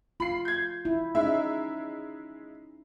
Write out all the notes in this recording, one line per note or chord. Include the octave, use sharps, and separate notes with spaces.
F4 B5 C7
G6 G#6
E4
G#3 C#4 D#4 E5